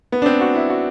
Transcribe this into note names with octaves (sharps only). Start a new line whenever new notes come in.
B3
D4
C4
F#4
E4
F#4